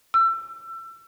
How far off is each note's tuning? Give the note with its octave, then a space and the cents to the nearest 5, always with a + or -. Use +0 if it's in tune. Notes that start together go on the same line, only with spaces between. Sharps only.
E6 +30